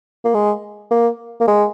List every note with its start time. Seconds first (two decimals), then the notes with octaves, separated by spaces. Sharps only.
0.25 A#3
0.34 G#3
0.91 A#3
1.40 A#3
1.47 G#3